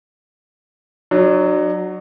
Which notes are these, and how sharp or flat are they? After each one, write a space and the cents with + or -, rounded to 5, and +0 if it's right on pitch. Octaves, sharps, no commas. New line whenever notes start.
F#3 +0 D4 +40